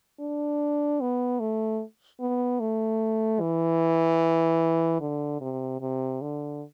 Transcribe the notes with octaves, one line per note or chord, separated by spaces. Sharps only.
D4
B3
A3
B3
A3
E3
D3
C3
C3
D3